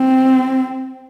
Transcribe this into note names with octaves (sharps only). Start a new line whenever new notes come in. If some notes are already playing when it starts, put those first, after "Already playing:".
Already playing: C4